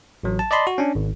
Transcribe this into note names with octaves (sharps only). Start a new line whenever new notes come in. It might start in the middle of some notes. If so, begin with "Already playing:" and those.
A1 F#3
A5
D5 D#5 A5 B5 C6
F#4
C#4 D4
G#1